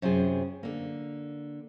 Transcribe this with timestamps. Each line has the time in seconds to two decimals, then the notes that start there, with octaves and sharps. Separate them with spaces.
0.02 F#2 C3 F4 G#4
0.63 D3 A#3